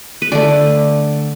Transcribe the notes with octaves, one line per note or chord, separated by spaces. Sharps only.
B4
D3 A3 D5